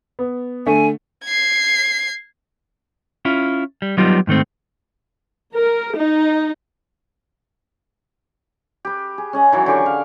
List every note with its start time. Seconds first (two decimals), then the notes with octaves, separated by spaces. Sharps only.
0.19 B3
0.67 D3 A3 G#5
1.24 G#6 C7
3.25 C#4 E4 F4
3.82 G3
3.97 F#3 G3 B3 D#4 F4 G4
4.27 G#2 D#3 A3 C4
5.55 A#4
5.98 D#4
8.85 G4 B4
9.18 G#4
9.33 C#4 G#4 D#5
9.52 D#3 E3 F#3
9.66 D3 G4 C#6
9.86 F5